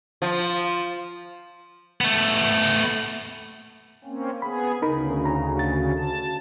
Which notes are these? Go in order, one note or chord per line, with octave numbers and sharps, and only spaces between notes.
F3
A3 B3
A#3 C4 C#4
B3 G#4 B5
D2 C#3 D#4 A#4 B5
A#5
F#4 A6
A5